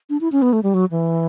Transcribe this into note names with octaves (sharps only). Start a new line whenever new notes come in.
D4
E4
C#4
B3
A3
G3
F#3
E3